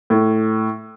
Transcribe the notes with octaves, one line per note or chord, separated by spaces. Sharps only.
A2